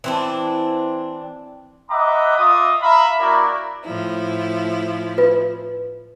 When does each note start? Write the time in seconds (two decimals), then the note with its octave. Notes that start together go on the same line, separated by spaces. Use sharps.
0.04 E3 C4 D4
1.91 D#5 E5 F#5 A#5 B5 D6
2.37 F4 D#5 E5 D6 D#6
2.82 E5 F5 A#5 B5
3.20 A#3 E4 F#4 A#4 D5
3.84 A2 F3 E4
5.18 F4 B4